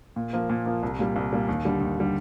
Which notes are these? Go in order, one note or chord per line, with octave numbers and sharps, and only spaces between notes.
A#2
F3 A#3
A#2
F3 A#3
C2
A#2 G3
C2
A#2 G3
D#2
D3 G3
D#2
D3 G3